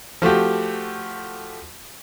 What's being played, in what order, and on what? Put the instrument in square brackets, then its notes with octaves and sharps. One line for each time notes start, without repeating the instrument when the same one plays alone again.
[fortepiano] F3 A3 F#4 G4